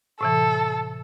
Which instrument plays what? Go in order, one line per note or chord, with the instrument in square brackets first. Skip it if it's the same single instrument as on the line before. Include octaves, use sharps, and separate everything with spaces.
[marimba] A2 C3 E3 [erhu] A4